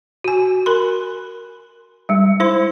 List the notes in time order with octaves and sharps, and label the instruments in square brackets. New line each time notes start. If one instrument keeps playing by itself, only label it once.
[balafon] F#4 G#5
A#4 B5 C6
G3 G#3
G#3 E4 C5 C6